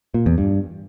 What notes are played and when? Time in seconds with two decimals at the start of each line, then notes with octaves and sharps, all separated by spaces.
0.14 A#2
0.26 E2
0.38 G2